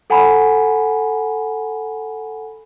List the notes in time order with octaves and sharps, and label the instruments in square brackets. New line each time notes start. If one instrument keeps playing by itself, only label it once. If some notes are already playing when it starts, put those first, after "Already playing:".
[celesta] A4 F#5 G#5 A#5 B5